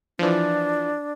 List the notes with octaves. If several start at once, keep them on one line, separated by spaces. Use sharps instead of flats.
E3 F3 D4